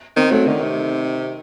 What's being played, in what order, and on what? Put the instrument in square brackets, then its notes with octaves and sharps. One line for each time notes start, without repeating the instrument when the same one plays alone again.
[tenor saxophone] D#3 [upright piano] C4
[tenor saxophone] F#3 [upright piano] A3
[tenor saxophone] D3 [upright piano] D#3
[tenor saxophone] C3